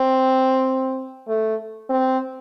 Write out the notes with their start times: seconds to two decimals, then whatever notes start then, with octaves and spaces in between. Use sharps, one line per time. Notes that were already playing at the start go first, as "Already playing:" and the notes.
Already playing: C4
1.28 A3
1.90 C4